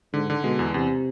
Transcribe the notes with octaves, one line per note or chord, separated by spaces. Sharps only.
G#2 D3
D3
B2 G#3
E2
E2 C3